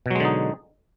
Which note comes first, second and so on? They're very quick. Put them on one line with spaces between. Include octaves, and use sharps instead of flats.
B2 F#3 G#3 D3 D#4